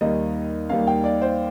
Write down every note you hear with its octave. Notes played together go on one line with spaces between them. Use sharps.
D#2 D#3 G3 A#3 D#5
D#2 D#3 G3 A#3 F5
G5
D5
C5